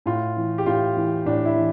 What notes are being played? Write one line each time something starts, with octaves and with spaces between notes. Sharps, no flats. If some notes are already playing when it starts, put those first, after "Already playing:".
A2 F4
E3
G4
A2 F4
E3
A2 D4
E4
E3